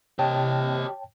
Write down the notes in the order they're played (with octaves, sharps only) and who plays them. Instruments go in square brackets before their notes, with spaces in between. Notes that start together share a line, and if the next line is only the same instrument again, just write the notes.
[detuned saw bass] C3 [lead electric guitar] G4 D#5 [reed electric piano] C#5 G5 A5